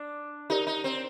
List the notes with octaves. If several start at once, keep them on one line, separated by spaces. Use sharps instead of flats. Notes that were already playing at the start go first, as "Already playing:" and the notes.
Already playing: D4
D#4 G4 A#4 D5
D#4
C4